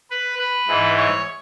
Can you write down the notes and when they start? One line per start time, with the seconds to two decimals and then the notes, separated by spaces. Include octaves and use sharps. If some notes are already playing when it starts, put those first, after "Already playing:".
0.11 B4
0.39 B4
0.68 G#2 E3
0.96 C#5